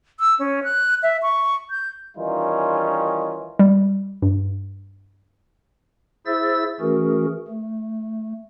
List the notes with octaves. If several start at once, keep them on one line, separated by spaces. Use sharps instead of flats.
E6
C#4
F#6
E5
C#6
G6
D#3 E3 G3 C#4 D#4 F4
G3
G2
E4 G#4 C5 E5 E6 A6
E3 A3 C#4 F#4 G#4 A#4
A3